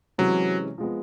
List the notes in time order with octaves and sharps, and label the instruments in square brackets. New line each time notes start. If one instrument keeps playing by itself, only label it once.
[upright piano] C3 E3 G#3 C#4 [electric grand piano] F#3
[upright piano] F3 G#3 B3